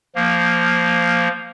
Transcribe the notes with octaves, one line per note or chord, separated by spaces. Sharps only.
F3 A#3